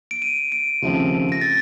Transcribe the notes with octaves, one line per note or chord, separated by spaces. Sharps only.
D7
D#7
D7
D#2 C#3 F3 A3 C4
A#6
A6